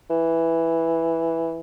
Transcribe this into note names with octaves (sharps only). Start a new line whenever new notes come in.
E3